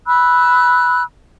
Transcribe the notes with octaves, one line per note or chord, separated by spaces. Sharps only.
B5 E6 F#6